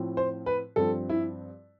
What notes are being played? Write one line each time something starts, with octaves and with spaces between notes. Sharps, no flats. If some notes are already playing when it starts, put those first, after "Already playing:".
Already playing: A2 F3 C4
C5
B4
G2 F3 C4 A4
E4